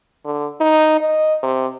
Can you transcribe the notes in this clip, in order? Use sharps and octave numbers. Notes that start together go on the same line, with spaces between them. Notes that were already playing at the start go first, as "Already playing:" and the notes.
D3
D#4
D#5
C3